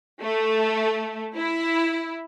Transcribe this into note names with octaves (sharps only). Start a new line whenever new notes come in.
A3
E4